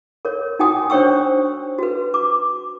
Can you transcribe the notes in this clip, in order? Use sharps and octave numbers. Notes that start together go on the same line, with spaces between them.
A#4 C#5
D#4 F#4 G5 G#5 D#6
D4 C5 C#5 G5 C#6 E6
F#4 B4
D6